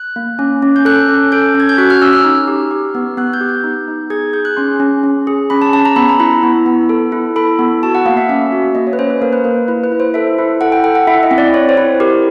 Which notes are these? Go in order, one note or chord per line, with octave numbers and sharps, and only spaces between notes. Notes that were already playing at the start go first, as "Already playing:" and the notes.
Already playing: F#6
A#3
C#4
C#4
G6
A4 F#6
C#4
A4 G6
C#4
G#6
G6
F#4 F#6
F6
C#4 E6
F6
D#4
G4
G4
B3
B3 F#6
G6
G4
G6
D#4
D#4
G#4 G#6
G#4 G6
F#6
C#4 C6
C#4
C#4
G#4
C#4 B5
A5
C#4 A5
A#5
B3 B5
A#5
E4 B5
B3
B3
A4
E4
A4 B5
B3
F#4 A5
F#5
A#3 F5
E5
C#4 E5
F#4
A#3 D#5
C#5
B4
C#4 C5
B4
A#3 A#4
B4
A#3 A#4
E4 B4
B4
E4
C5
A4 E5
E4
A4 F#5
G5
A4 G5
F#5
E4 E5
D#5
C4
D5
C4 C#5
C5
E4
G4 A#4